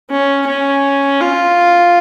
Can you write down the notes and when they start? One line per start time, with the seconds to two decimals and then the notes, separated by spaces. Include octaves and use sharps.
0.10 C#4
0.47 C#4
1.21 F4